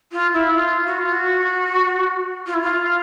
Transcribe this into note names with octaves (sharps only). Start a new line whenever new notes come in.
F4
E4
F4
F#4
F4
F#4
F4
E4
F4